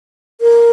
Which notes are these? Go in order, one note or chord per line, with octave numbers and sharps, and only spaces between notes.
A#4